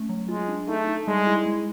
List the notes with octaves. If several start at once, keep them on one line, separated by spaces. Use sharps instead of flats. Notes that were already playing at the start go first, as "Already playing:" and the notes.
Already playing: A3 C#4
F#3
G#3 F4
D4
A3 D#4
D#4
G3 G#3
E4
G#3